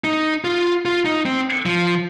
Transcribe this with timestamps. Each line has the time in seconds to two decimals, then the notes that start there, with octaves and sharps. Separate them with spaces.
0.04 D#4
0.44 F4
0.85 F4
1.05 D#4
1.26 C4
1.66 F3